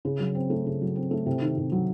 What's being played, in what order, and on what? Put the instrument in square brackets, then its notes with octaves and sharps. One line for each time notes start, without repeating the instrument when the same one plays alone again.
[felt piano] C#3
F#3
C4
A3
C#3
F#3
C4
A3
C3
D#3
C3
F#3